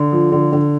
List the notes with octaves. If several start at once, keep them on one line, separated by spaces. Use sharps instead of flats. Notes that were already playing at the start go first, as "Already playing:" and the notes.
Already playing: D3
F3
D3
D3